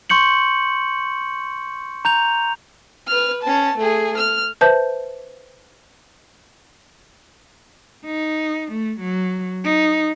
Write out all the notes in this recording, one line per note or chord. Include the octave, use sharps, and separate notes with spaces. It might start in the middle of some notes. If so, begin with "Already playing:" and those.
C6 C#6 G6 C#7 F#7
A#5 G6 F7
B4 F6
C#4 A5
A3 G#4
F6
B4 C5 E5 A5 G6
D#4
A3
F#3
D#4